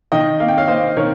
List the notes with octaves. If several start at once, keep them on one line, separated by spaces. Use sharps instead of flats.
D#3 D#5 G5
A#3 F5
G5
C#5 F5
A#3 C5 D#5
D#3 A#4 C#5